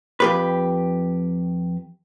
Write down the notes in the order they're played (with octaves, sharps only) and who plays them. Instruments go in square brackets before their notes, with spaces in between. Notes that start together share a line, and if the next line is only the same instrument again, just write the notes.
[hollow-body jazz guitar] F2 G4 B4